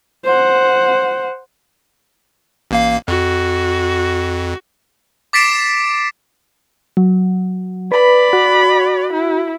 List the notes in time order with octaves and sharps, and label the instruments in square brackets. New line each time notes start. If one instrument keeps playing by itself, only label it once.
[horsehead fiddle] C5 F#5
[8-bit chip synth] A1 A#3 F5
[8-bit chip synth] F2 [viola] F#4
[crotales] D6 A6 B6 C7 D7 E7
[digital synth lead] F#3
[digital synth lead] B4 [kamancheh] D5 B5
[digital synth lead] F#4
[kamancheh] E4